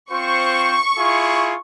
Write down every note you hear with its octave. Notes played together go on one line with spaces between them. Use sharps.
C4 F4 C5 C#6
E4 F4 G#4